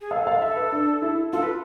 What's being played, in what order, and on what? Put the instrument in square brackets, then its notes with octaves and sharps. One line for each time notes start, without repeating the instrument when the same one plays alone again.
[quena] G#4
[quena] A4 [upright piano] F5
[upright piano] F5
E5
B4
D4
E4
[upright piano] F4 [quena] A4
[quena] B4